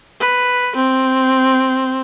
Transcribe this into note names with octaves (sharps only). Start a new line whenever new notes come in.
B4
C4